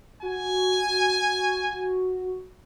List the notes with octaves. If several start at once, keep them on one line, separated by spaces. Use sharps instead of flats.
F#4 G#5